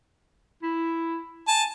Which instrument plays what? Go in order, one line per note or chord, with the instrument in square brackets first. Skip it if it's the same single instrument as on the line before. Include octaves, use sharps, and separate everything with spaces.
[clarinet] E4
[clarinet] G#5 [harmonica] A5